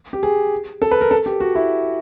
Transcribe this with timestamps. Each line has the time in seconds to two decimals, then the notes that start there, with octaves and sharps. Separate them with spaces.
0.13 G4
0.23 G#4
0.82 A4
0.91 B4
1.01 A#4
1.11 A4
1.26 G4
1.40 F#4
1.55 E4